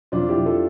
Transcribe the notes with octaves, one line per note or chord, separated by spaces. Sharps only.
F2 D4 F4
E4 G4
F2
F4 A4